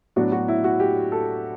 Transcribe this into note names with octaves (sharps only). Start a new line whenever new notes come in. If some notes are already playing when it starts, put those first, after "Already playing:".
A2 F#3 B3 D4 F#4
F#4
E4
F#4
G4
A4